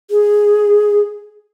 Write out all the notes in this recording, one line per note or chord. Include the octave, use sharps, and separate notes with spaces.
G#4